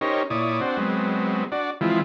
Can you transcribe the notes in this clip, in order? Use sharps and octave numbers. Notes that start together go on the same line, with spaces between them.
C#4 D#4 G4 A#4 C5 C#5
A#2 E4 C#5 D5 D#6
C4 D4 F#4 C5
F#3 G#3 B3 C4
D4 F#4 D5
E3 F3 G#3 C4 E4 F4